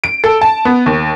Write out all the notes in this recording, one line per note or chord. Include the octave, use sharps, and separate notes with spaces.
D7
A4
A5
B3
D#2